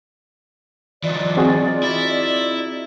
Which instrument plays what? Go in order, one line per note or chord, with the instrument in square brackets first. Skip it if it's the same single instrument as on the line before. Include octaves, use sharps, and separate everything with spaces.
[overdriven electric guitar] E3 F#3 [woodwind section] D#4 F4 D5
[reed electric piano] C4 F#4 G#4
[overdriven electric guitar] E4